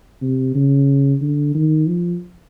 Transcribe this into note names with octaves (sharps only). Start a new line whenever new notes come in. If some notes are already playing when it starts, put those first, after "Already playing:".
C3
C#3
D3
D#3
F3